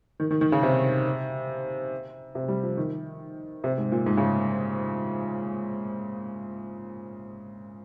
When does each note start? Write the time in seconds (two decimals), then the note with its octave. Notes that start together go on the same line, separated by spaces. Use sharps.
0.20 D#3
0.30 D#3
0.41 D#3
0.52 C#3
0.63 C3
2.35 C3
2.48 G3
2.63 F3
2.77 D#3
3.64 C3
3.78 G#2
3.92 A#2
4.06 G#2
4.17 C#3